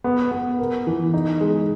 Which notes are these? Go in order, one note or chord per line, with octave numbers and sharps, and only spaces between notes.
B3
B3
A#4
E3
D#4
G#3